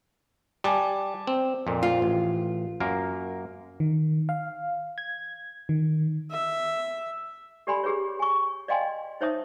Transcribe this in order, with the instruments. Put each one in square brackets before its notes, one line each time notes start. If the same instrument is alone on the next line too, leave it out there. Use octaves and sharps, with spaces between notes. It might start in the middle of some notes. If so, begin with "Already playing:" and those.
[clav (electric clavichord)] G3 [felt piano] G#5 A5 D6
[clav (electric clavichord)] C4
F2 A#2
[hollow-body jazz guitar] F4
[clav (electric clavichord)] A1
F#2 A#3 A#4
[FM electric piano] D#3
F5
G#6
D#3
[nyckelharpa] E5
[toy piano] G4 A4 D5 G#5 B5 C6
G4 G#4 B4 C#5
G#5 C#6
D5 D#5 F5 G5 G#5 C6
D#4 C5 C#5 E5 A5 D#6